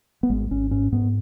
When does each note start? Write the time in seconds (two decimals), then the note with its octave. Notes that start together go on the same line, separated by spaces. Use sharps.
0.23 B3
0.29 G#1 G#3
0.51 G#1 C#4
0.71 G#2 C#4
0.92 G#2 B3